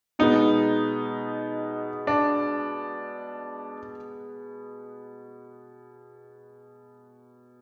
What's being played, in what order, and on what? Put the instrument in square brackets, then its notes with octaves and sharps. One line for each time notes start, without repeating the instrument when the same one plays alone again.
[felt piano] B2 G#3 B3 [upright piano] D#4
[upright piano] D4